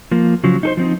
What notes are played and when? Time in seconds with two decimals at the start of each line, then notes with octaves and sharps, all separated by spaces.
0.12 F3 A#3
0.44 C#3 F3 F#3
0.63 D#4 A4 C5
0.77 F3 C4 D#4